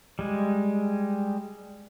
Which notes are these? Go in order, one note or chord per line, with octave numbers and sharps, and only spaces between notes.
G3 G#3